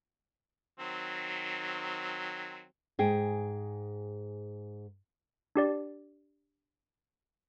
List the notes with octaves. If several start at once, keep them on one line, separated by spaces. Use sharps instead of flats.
D#3 F#3 C4
G#2 G#4 G5
D4 G4 D5